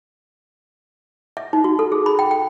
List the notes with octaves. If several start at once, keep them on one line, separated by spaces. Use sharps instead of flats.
E5
D#4
F#4
A4
G#4
B5
G5
G5